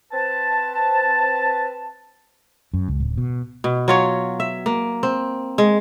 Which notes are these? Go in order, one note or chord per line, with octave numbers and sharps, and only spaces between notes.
C4 B4 A5
F#2
C#2
D1
B2
B2
F#3 F4 C#5
E5
A#3
C4
G#3